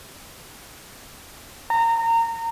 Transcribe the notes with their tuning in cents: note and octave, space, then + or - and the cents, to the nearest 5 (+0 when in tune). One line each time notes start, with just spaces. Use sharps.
A#5 -25